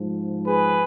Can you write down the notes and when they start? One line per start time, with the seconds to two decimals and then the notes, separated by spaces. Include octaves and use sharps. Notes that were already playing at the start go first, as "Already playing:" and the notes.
Already playing: G#2 F3
0.45 G#4 B4